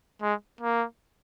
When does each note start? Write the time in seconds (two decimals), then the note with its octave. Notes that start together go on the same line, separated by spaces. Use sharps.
0.22 G#3
0.61 A#3